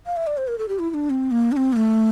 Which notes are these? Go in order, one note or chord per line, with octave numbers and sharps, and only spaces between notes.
F5
E5
D5
C5
A#4
A4
G4
E4
E4
D4
C4
A#3
D4
C4
A#3
A3